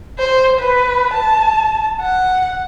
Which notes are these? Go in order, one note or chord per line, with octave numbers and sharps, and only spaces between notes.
C5
B4
A5
F#5